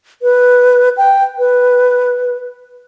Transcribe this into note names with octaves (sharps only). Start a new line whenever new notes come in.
B4
G5
B4